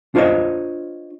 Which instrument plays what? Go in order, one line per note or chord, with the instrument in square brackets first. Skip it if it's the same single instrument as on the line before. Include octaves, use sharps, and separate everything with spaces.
[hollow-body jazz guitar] D4 F4 C5 C#5 D#5